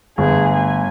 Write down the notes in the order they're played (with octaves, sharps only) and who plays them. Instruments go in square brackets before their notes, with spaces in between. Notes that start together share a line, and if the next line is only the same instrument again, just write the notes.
[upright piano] G1 [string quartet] A3 G#4
[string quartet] G#5